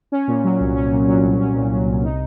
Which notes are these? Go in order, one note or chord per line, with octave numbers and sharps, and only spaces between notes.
C#4
A#2
F#3
C2
C#4
A#2
F#3
C2
C#4
A#2
F#3
C2
D#4